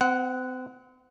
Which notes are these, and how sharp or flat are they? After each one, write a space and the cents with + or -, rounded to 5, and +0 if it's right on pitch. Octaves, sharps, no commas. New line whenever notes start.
C4 -40 F#5 +0